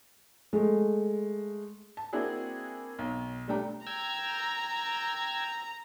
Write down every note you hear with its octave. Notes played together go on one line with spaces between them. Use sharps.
G#3 A3
A5
A#3 C4 D4 E4 F#4 G#4
B1
G3 A3 D4 G5 A#5
G5 A#5 E6 G#6